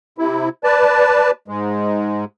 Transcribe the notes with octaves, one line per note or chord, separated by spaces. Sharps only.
C3 E4
B4 D5 A5
G#2 G#3